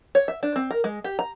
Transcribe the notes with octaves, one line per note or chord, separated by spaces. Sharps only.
C#5
E5
D4
C4
A#4
G#3
G4
A#5